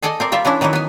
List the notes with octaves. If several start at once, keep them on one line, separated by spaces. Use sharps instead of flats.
G#4 A4 D5 D#5 G#5
C4 A#4 D5
G3 F4 D5 E5
E3 C#4 D4 E4
D#3 E3 F#3 D#4 E4
B3 G#5